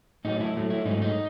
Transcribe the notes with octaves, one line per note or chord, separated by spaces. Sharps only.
A2 F#3 A3 D#4
E4
A2 F#3 A3
E4
G#2 F#3 A3 D#4
D#4